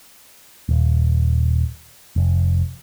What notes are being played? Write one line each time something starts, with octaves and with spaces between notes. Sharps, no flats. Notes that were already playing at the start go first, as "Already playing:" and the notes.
D#1
F1